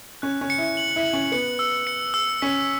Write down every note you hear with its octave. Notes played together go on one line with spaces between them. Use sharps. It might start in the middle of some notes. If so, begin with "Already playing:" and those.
C#4 F#6
C#4
C#7
E4
F#7
E4
F#7
C#4
B3 C#7
E6
C#7
E6
C#4 B6